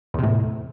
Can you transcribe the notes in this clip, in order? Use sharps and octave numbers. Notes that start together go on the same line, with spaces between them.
E2 A2 C3